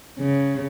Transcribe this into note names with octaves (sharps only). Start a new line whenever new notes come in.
C#3